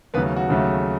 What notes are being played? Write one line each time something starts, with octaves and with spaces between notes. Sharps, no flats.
D#2 C#3 F#3 A3 B3 B4
F#4
D#2 C#3 F#3 A3